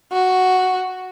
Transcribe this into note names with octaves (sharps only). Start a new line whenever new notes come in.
F#4